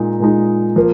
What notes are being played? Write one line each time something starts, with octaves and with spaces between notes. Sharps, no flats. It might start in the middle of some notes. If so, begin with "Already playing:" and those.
Already playing: A#2 G#3 D#4
A#2 G#3 D#4
F3 A#3